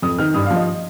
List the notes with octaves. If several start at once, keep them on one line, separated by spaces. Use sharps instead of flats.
F2 D#6
D#3 F6
G2 D#6
F5
F3
D#5